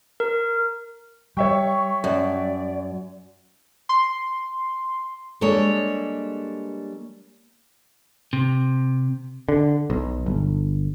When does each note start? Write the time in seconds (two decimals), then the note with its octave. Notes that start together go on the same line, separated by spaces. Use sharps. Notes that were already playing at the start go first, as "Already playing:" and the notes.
0.20 A#4
1.37 G3 C#5 E5 G5 C#6
2.04 F#2 D5
3.89 C6
5.41 G3 G#3 A#3 D4 A4 C#5
8.33 C3
9.49 D3
9.90 B1
10.26 G1